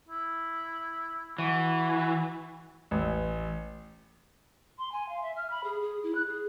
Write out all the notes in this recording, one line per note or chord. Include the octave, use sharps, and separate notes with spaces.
E4
E3 F#4
A1
C6
G#5
F5
E5
F6
B5
G#4
G#4
E4
F#6
G#4